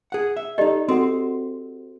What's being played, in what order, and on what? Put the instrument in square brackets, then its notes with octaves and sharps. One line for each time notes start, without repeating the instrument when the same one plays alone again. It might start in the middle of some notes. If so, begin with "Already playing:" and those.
[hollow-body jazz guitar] G#4 F#5
E5
[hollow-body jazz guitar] D#4 A4 [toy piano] G4 D5 D#5
[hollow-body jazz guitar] C4 [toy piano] F#4 A4 F#5